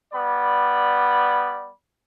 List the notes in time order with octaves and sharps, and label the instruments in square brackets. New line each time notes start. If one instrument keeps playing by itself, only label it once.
[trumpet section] G3 B3 D5 B5